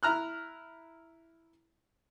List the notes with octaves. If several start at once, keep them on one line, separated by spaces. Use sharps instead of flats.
E4 A#5 F6 F#6